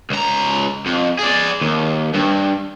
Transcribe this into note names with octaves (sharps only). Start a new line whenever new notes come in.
C#2 A#5
F2
G#4 D5
D#2
G2